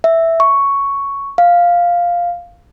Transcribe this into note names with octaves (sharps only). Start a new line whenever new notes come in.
E5
C#6
F5